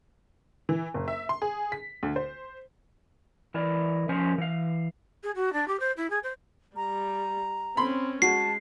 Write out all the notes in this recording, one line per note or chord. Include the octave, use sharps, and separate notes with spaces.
E3
F#1
E5
C6
G#4
B6
D2
C5
E3 E4 A#4 D5
F3 C#4 A#4 C5
E3 F5
G#4
F#4
D4
G4
C5
E4
G#4
C5
G3 A#5
C4 C#4 B5 C6
G#3 F#4 A5 C7